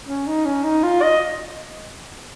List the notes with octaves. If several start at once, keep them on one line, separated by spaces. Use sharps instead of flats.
C#4
D#4
C#4
D#4
F4
D#5